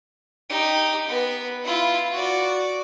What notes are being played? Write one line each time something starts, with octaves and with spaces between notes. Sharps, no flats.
D#4 G4
B3 B4
E4 F4
F#4 D5